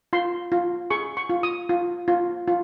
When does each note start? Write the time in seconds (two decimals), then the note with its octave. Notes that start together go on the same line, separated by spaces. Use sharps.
0.13 F4 C6
0.52 F4
0.90 G#4 C#6
1.17 C#6
1.30 F4
1.43 D#6
1.69 F4
2.08 F4
2.48 F4